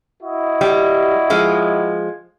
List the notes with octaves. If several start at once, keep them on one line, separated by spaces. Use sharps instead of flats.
E4 F#4 D#5
G3
F3 G#3